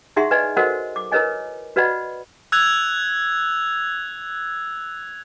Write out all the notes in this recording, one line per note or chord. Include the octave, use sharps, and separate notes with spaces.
D#4 E4 G#4 E5 F#5 C6
B4 D5 D#5 G#5
F#4 A4 A#4 C5 D#5 F#5
D6
E4 A#4 B4 C#5 D#5 G#5
F#4 B4 D5 D#5 F#5 B5
E6 F#6 G#6 F7